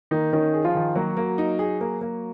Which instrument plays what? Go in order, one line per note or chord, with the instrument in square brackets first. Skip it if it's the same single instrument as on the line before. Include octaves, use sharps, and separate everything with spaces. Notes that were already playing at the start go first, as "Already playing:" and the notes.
[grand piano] D#3 D#4 [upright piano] A#3
[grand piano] D#3 D#4 [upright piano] C#4
[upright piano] G#4
[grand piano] F3 F4
[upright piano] D#3
[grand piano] F#3 F#4 [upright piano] A#3
[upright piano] A#3
D#4
G#4
A#3
A#3